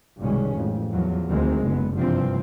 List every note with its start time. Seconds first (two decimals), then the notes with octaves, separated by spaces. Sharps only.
0.20 C2 G2 B2 D#3 G#3 C#4
0.55 A1 F2
0.92 E2 F3 F#3
1.28 D2 D#3 G#3 C4
1.62 F#1 C2 D3 B3
1.94 G2 C3 E3 F3 C4